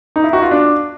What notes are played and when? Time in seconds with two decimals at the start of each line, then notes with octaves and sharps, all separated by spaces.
0.16 D#4
0.24 E4
0.33 F#4
0.42 F4
0.51 D4